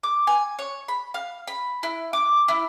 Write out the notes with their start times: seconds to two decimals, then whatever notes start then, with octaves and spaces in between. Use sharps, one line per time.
0.03 D6
0.27 G#5
0.59 C#5
0.88 B5
1.14 F5
1.47 B5
1.83 E4
2.13 D6
2.48 E4